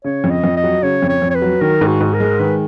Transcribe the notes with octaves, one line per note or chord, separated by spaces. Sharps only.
C#3 C#5
F2
D#5
F2
D#5
F#3
C#3 C#5
F2
C#5
F2
C#5
B4
F#3
D#3 A#4
G#2
F#4
G#2
A#4
G#3
D#3 B4